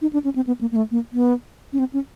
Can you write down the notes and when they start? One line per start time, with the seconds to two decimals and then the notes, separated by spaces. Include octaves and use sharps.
0.02 D#4
0.13 D4
0.24 C#4
0.36 C4
0.47 B3
0.61 A#3
0.72 A#3
0.76 A3
0.91 A#3
1.13 B3
1.73 C#4
1.79 C4
1.93 C#4